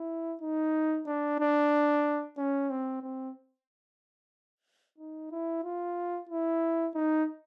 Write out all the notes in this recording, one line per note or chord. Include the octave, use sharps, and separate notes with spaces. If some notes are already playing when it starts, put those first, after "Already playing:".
Already playing: E4
D#4
D4
D4
C#4
C4
C4
D#4
E4
F4
E4
D#4